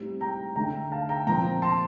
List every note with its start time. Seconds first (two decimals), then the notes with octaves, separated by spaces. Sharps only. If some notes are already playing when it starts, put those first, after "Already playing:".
Already playing: A2 G3 C4 D#4
0.21 G5 A#5
0.56 D3 A3 D#4 G5 A#5
0.92 F5 A5
1.09 G5 A#5
1.27 A#2 F3 C4 G5 A#5
1.62 A5 C6